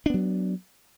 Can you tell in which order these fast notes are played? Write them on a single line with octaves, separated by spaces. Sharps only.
D4 B3 F#3